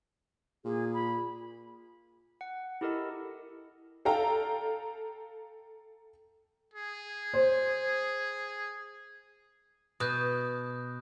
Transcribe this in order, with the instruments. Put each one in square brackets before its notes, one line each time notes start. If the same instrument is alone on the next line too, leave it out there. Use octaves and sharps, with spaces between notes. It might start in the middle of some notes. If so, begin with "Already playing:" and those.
[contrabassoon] A#2 [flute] G#4
[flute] B5
[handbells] F#5
E4 G4 A4 A#4 D#5
[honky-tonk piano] A4 F5 G5 A#5
[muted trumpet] G#4
[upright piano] C5
[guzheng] B2 [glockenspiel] D#6 F#6 G6